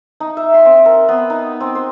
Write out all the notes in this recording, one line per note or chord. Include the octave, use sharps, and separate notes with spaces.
D#4
E5
C6
C4
A#4
B3
D#4
C4
C5